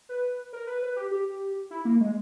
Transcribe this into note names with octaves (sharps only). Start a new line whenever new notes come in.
B4
A#4
B4
B4
G4
G4
E4
A#3
G#3